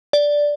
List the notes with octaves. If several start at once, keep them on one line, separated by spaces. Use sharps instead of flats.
D5